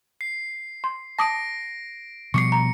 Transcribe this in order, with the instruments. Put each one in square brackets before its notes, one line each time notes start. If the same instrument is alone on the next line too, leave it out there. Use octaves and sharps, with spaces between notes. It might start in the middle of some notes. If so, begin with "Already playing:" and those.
[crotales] C7
[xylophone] C6
[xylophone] A5 D6 D#6 [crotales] A#6 D7
[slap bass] B2 F3 G3 [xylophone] C#6 D6 C7 [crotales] C#7
[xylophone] A#5